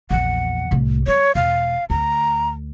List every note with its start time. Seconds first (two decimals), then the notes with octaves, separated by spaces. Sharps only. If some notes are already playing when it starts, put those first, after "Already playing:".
0.11 A#1 E2 F#5
0.71 C2 A2
1.07 G3 C#5
1.35 E1 F5
1.90 D2 A#5